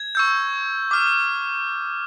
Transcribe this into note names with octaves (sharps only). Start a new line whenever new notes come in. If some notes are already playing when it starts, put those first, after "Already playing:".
Already playing: G#6
C#6 E6 G6
D6 F6